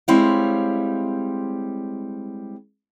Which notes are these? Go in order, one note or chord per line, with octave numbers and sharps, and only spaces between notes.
G3 G#3 C4 E4 C#5 F5